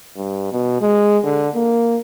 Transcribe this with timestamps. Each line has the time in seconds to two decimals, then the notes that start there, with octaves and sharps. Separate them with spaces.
0.17 G2
0.52 B2
0.81 G#3
1.24 D3
1.55 A#3